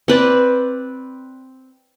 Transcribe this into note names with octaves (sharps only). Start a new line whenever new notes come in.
C4 B4 D5